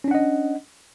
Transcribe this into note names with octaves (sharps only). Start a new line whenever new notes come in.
C#4 D4 D#5 F#5